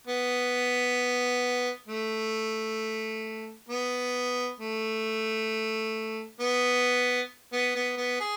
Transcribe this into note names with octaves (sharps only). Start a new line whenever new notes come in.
B3
A3
B3
A3
B3
B3
B3
B3
G#4